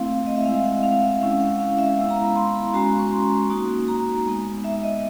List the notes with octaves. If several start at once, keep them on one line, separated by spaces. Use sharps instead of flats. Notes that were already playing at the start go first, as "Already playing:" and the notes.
Already playing: A3 C4 E4 F5
D#5
E5
G#3 C4 E4 F5
F#5
F5
E5
G#3 C#4 E4 F5
F#5
F5
E5
G#3 B3 E4 F5
A#5
B5
C6
B5
G#3 C#4 F#4 A#5
C#6
C6
A#3 D#4 F#4
A#5
G#3 B3 D#4
E5
D#5